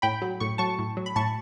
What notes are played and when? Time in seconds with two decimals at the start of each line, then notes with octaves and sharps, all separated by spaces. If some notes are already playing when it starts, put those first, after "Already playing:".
0.02 A2 G5 B5
0.21 F#3
0.40 A2 C#6
0.58 F#3 A5 C#6
0.79 A2
0.97 F#3
1.06 B5
1.16 A2 A5 C#6